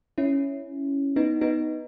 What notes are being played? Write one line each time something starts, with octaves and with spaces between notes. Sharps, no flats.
C#4 E4
B3 D#4
B3 D#4